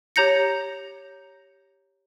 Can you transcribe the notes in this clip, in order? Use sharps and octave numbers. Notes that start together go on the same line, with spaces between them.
G4 C#5 A#5 G6 A#6 C#7